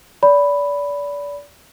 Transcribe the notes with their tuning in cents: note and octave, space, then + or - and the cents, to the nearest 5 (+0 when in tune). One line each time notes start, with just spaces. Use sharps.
D5 -30 B5 +0